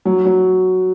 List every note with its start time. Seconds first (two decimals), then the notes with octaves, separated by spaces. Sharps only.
0.05 F#3
0.25 F#3